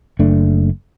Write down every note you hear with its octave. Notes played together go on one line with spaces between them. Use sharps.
F#1 A3 D4